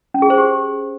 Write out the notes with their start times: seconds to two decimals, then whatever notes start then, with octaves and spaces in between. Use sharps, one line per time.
0.14 C#4
0.22 G#4
0.30 C5
0.38 G4